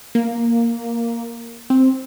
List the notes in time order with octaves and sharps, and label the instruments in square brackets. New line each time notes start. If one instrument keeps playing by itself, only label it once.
[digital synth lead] A#3
C4